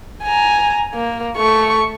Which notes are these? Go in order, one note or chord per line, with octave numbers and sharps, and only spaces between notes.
G#5 A#5
A#3
A3 C#6